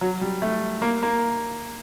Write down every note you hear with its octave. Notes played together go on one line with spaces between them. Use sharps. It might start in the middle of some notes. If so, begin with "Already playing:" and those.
F#3
G3
A3
A#3
A#3